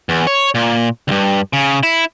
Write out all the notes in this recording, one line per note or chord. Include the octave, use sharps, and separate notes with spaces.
E2
C#5
A#2
D2 G2
C#3
E4